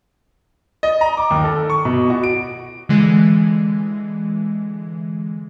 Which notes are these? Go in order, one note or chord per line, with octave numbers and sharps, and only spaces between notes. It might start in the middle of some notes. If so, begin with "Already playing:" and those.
D#5
A#5
D6
D#2
A4
C#6
B2
F#4
D7
D3 E3 G#3